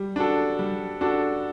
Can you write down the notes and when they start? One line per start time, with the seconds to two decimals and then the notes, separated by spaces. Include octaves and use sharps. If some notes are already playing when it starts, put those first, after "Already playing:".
Already playing: G3
0.16 D4 F#4 A4
0.59 G3
1.01 D4 F#4 A4